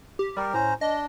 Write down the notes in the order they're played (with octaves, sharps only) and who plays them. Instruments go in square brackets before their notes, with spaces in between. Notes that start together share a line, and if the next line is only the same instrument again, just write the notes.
[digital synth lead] G4
[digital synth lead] G3 [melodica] G4 A#4
[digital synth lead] A2 [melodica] C#4 C5 A#5
[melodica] D4 [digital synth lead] D#5